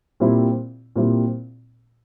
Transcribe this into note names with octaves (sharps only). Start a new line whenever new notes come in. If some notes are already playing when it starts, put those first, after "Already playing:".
A#2 G3 C4 E4
A#2 G3 C4 E4